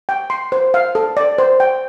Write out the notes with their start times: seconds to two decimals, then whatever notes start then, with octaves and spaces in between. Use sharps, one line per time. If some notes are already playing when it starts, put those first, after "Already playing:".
0.09 G5
0.30 C6
0.52 C5
0.74 F5
0.95 A4
1.17 D5
1.38 C5
1.60 G5